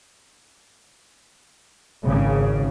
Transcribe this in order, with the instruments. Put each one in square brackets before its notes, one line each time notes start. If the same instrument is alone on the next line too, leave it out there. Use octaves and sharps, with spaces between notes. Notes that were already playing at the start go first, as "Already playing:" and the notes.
[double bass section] G#1 C#3